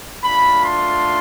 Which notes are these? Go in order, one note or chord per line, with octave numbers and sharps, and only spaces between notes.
A3 D4 F4 B5
C6